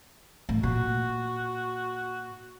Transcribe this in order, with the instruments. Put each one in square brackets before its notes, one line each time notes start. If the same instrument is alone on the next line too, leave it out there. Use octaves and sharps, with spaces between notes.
[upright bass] A2
[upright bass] A#2 [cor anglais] F#4